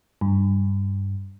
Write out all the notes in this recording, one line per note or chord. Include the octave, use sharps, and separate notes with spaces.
G2